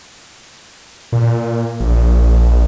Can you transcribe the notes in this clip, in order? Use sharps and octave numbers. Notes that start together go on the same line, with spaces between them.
A#2
A#1